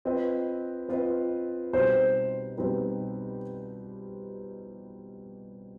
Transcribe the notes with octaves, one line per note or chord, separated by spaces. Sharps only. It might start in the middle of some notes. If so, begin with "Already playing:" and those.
C4 F4 B4 D#5
C4 F4 B4 D#5
B2 G3 C4 D#4 B4 C5
B2 G3 C4 D#4 B4